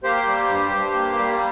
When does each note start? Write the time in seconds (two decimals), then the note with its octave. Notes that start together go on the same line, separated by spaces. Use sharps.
0.03 A#3 G4 C5
0.27 G3
0.48 G2
0.71 G2
0.95 A#3
1.17 G3